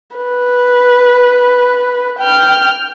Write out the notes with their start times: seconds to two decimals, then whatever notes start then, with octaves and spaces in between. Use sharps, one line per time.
0.16 B4
2.19 G5 F6